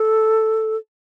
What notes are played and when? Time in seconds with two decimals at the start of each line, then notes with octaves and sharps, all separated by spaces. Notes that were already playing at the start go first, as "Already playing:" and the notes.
Already playing: A4